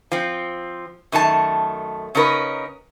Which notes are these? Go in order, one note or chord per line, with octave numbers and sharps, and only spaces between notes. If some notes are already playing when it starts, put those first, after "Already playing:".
F3 C4
F#2 D#3 A3 F4 A5
C#3 C#4 D#4 A#4 B4